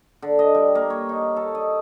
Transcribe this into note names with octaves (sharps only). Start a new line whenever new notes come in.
D3
D#5
G3
A#3
C#5
D#4
A4
D#5